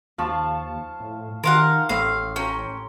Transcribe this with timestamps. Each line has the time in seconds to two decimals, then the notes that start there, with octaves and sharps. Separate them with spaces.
0.18 D#2 F3 F5 A5 C#6
1.00 A2
1.44 D#3 G4 A#4 F5 F#5 C6
1.89 A1 A2 F5
2.36 C#4 G5 A#5